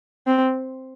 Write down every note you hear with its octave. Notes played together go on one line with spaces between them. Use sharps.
C4